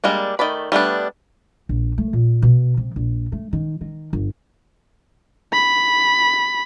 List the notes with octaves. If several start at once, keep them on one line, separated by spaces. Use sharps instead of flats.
G3 G#3 A#3 D4
D#3 A3 D5 B5
G3 A3 B3 D4
A#1
A3
A#2
B2
C3
A#1
A3
D#3
D#3
G1
B5